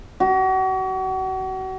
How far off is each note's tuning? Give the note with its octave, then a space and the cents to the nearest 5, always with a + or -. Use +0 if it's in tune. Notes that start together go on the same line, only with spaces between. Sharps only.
F#4 +35